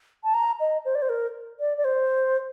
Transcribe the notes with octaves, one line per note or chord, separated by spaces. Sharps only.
A5
A#5
D#5
C5
D5
C5
A#4
D5
D5
C5